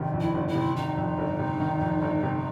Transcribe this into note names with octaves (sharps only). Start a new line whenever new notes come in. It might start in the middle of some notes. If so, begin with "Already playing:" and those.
Already playing: G1 F2 C3 D#3
F2
E4
G1
E4
C3
D#3 D#4
F2
G1
C3
D#3
F2
G1
C3